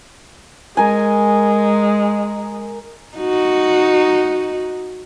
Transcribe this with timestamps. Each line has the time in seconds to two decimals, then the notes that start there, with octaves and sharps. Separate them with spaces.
0.77 G#3 A#4 G#5
3.17 D#4 F#4